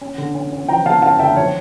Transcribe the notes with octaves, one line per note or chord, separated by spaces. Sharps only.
C#4
D3
C#4
C#4
F3 G5 A#5
C#4 F5 A5
C#4 F5 A5
D3 E5 G5
F3 C#5